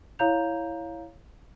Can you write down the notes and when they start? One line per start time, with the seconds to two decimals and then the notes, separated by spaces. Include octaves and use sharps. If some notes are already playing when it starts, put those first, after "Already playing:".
0.19 E4 C#5 F5 A#5 G6 F7